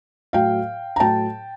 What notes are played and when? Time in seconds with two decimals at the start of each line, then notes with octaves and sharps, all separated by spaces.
0.33 A2 F#3 F5 G5
0.96 A#5
1.00 A2 F#3 G5 A5